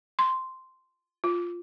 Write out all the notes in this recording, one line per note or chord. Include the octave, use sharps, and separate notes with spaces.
C6
F4